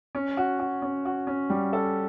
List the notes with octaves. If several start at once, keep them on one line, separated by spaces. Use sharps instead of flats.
C#4
F#4
F#4
C#4
F#4
C#4
G3
A4